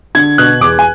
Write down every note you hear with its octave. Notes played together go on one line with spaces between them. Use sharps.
D3 G#6
B2 F#6
E2 D6
G#5